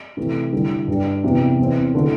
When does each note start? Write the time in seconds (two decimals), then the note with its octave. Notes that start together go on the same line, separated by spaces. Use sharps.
0.17 C3 E3 A3 E4
0.53 D3 G3 E4
0.88 G2 G3 D4
1.24 E2 C3 E3
1.59 E2 E3 C4
1.95 D3 A3 E4